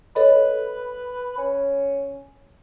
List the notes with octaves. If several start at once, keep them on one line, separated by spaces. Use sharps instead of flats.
A4 B4 C#5 D#5
C#4